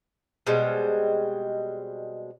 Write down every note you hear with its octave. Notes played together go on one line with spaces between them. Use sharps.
B2 G3 G#3 C4